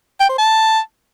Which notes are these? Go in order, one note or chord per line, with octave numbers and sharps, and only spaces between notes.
G5
C5
A5